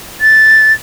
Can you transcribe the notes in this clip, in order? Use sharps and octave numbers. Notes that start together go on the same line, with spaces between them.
A6